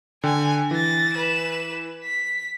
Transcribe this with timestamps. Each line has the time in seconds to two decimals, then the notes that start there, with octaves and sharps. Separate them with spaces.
0.24 D3 G5 G#5
0.71 E3 A6 A#6
1.13 B4 E7
2.03 B6